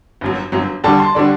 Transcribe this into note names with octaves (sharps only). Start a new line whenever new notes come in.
G1 F#2 F#3
G1 F#2 F#3
D#2 D3 G3 D4 F#4 A5
C6
D3 G3 D4 F#4 D5